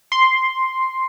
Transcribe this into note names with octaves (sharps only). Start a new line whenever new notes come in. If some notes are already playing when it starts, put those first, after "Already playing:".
C6